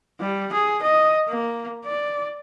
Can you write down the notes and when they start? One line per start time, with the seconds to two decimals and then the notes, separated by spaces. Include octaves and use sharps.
0.20 G3
0.53 G#4
0.83 D#5
1.28 A#3
1.85 D5